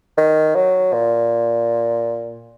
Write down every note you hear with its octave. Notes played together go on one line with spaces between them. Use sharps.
D#3
F#3
A#2